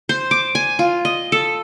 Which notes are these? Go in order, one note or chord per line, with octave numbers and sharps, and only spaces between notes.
C5
D6
G#5
F4
D#5
A4